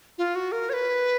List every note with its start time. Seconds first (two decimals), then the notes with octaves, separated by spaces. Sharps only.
0.18 F4
0.35 F#4
0.52 A#4
0.70 C#5
0.73 B4